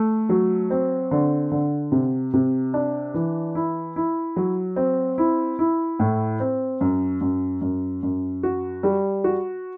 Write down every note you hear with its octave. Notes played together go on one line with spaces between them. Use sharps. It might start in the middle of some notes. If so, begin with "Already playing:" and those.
Already playing: A3
F#3
C4
D3
D3
C3
C3
D4
E3
E4
E4
F#3
C4
E4
E4
A2
C4
F#2
F#2
F#2
F#2
F#4
G3
F#4